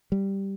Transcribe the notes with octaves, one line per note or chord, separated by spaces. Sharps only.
G3